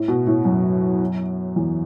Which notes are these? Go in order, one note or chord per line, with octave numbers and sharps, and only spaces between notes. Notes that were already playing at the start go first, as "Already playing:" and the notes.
Already playing: A2
B2
A2
F#2
E2